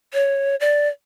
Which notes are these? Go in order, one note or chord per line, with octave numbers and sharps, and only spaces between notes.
C#5
D5